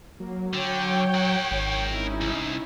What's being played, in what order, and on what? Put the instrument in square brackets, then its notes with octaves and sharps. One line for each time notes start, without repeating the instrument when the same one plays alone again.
[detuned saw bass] F#3 [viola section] A#3
[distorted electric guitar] D3 [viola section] C#5 G5
[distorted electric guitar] A#4 F#5
[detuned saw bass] G#1
[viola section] C#4 D#4 E4
[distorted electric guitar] C2